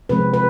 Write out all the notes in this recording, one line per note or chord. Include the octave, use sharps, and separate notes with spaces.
C3 F3 G#3 C4 B4
B4